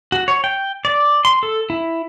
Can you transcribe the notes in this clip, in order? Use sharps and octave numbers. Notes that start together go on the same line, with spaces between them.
F#4
C#5
G5
D5
C6
A4
E4